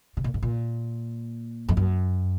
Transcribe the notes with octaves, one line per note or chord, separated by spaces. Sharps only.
C3
A#2
G#2
A#2
F2
F#2